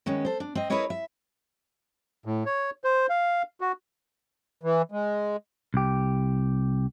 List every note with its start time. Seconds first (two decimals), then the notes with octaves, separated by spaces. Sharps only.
0.06 D#3 G#3 B3 C#4
0.25 A4 C5
0.40 D4
0.55 C4 D#5
0.70 E4 G#4 A#4 B4 C#5 D#5
0.90 E5
2.25 A2
2.46 C#5
2.84 C5
3.10 F5
3.61 F#4
4.63 E3
4.92 G#3
5.74 C2 G4